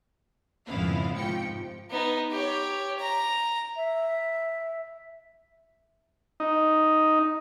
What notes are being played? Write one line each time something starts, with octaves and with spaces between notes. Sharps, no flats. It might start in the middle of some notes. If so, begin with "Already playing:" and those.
G#1 F2 C#3 B3 E4 F5
G#2 C3 F3 G5 C#7
B3 D#4
G4 C#5
A#5
E5
D#4